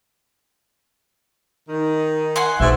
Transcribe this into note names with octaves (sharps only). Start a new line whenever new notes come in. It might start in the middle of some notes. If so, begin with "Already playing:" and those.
D#3 D#4
F#5 G#5 C6
A#1 G#2 B2 E5